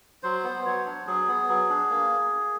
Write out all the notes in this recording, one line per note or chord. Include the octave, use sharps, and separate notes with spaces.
F#3 C5
B3
F#3 C#5
D4
F#3 G#4
B3
F#3
D4
A#3